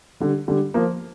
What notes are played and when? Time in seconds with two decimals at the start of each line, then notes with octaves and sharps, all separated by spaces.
0.20 D3 G3
0.48 D3 G3
0.74 F3 A#3